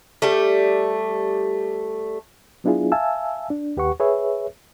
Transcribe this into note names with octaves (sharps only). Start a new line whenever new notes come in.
G3 A3
F#3 B3 D4 E4 F4 G#4
E5 F5 G#5 A5 E6
D4
D#2 G4 B4 F#5 C#6
G#4 B4 C#5 E5